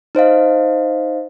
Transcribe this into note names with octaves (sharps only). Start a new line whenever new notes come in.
D#4 C5 D#5 F5